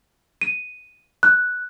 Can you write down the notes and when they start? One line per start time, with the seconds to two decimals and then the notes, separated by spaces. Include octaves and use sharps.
0.41 D#7
1.23 F#6